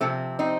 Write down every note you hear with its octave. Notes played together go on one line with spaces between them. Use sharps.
C3 F3 A3 C4
C4 D#4